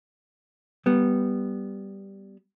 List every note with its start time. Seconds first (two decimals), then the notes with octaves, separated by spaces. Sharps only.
0.86 G3 B3